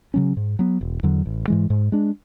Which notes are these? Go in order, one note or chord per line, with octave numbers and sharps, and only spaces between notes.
C#3 F#3 C#4
G#2
F#3 B3
E1
E2 D3 F#3
A1
G#2 E3 G#3
G#2
G#3 D4